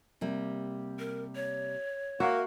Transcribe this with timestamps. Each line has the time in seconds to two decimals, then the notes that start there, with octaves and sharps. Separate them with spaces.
0.21 C3 G3 A#3
0.99 A#4
1.35 C#5
2.20 A#3 F#4 E5